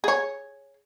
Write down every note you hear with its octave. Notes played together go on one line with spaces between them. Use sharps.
G#4 C#5